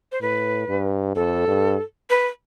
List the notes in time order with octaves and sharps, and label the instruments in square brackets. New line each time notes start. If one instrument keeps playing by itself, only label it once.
[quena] C5
[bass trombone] A2 [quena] B4
[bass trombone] G2
[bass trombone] F2 [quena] A4
[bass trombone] G2
[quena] B4